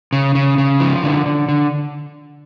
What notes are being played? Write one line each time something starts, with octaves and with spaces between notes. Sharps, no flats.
C#3
C#3
C#3
F3
D3
D3
D3